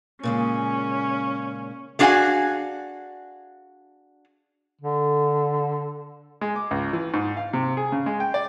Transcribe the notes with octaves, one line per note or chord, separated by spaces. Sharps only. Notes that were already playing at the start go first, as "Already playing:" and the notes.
A#2 C#3 G#3 C#4
A3 D4 F#4 G#4 F5 G#5
D3
G#3
D6
C#2
E3
G#2
F5
C3
G#4
C#3
G#3
G5
D5